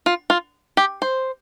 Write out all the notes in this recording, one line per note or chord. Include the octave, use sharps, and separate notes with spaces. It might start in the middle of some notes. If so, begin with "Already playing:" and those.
F4
F4
G4
C5